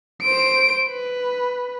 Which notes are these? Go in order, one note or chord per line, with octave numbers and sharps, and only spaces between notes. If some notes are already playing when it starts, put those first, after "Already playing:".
C5 D7
B4